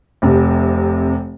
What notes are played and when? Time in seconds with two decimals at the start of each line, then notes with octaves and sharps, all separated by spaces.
0.22 F1 C3